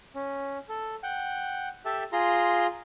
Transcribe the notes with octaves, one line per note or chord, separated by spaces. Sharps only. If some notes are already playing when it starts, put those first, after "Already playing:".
C#4
A4
F#5 G5
G4 A4 E5 A5
F4 G#4 A#5 C6